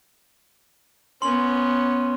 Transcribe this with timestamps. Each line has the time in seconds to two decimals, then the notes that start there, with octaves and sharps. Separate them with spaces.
1.22 B3 C#4 C6 F#7